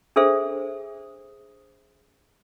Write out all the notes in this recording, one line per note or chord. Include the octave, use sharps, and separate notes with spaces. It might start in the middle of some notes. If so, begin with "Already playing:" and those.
D4 G#4 A4 C5 E5